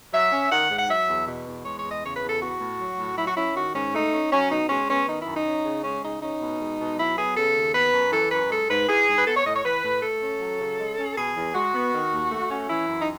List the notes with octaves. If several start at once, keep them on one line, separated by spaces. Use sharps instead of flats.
F#3 E5
C#4
D#3 F#5
G#2
F#5
F#3 E5
E2
B2
E2
G#3 C#5
C#5
E2
D#5
C#3 C#5
B4
E2
A4
B3 F#4
A2
F#3
A2
F#3 E4
F#4
C#4 E4
D#3 F#4
G#2 C#4
A3 D#4
C#4
F#3 C#4
B2 D#4
G#3 C#4
B3 C#4
D#3 D#4
E4
F#2
D#4
C#4
C#3
G#3 C#4
C#3 D#4
C#4 D#4
B2
G#3
B2
F#3 E4
B3 G#4
C#3 A4
D#2
B3 B4
F#2
E3 A4
F#2 B4
G#3 A4
G#2 B4
E3 G#4
G#2
B4
B3 A4
C#5
A2 D#5
C#5
E3 B4
A2
A3 A4
C#4
F#3
C#3
G#3
C#4
B2 G#4
E2
G#3 F#4
B3
D#3
D#2
A3
C#4
E3 E4
F#2
D#4